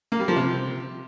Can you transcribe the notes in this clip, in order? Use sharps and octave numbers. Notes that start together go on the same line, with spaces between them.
A#3
G3
F3
C3